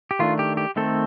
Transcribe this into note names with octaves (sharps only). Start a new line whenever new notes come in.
G4
D#3 A3 D4 F4
G4
G4
D#3 A3 C4 A4